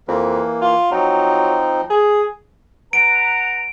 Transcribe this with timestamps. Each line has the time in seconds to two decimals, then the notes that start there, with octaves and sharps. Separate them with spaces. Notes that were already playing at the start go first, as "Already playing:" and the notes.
0.08 F2 E3 A#3
0.61 F4
0.91 F3 F#3 C4 D#4
1.90 G#4
2.93 B4 F#5 A#5 D7